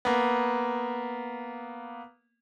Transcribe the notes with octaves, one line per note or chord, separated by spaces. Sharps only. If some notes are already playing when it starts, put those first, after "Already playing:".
A#3 B3